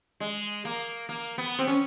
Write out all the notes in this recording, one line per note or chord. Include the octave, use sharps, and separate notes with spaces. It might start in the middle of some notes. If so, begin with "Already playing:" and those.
G#3
A#3
A#3
B3
C4
C#4